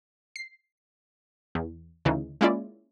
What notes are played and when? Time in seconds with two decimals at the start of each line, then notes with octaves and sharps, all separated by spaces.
0.36 C7
1.55 E2
2.05 D2 C#3 E3 D#4
2.41 G#3 A#3 C#4 E4 F4 D5